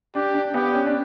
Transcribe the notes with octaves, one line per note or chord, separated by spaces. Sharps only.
D4 G4
D4
B3 G4
C#4
D4